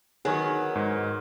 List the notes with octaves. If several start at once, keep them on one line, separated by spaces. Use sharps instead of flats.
D#3 F#3 B3 G#4 C#5
G#2